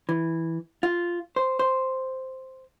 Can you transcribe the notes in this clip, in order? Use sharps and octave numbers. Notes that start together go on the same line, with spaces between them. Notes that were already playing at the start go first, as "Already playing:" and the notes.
E3
F4
C5
C5